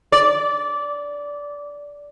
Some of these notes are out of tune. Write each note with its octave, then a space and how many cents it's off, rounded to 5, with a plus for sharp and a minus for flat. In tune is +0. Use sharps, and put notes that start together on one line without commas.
D5 -15